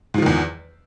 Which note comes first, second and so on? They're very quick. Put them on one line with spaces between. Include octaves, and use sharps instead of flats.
G#2 F3 D#3 E2